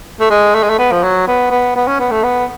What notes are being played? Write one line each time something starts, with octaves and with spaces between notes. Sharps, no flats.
A3
G#3
A3
G#3
A3
B3
F3
F#3
B3
B3
B3
C#4
B3
A3
B3